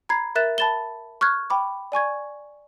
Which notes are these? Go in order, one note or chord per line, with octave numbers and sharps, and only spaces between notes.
A#5 B5 G#6 C7
A#4 E5 F#6 A6 E7
A5 B5 A6 E7 G7
C#6 F6 F#6 G#6
G5 B5 D6
D5 G#5 C#6 G#6